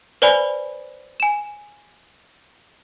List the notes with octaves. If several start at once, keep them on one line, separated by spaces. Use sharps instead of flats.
B4 C5 D5 G#5 B5
G#5 E7